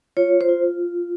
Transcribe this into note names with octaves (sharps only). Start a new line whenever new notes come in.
F4 C#5
C5
F4